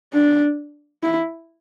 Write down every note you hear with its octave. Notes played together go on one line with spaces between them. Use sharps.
D4
E4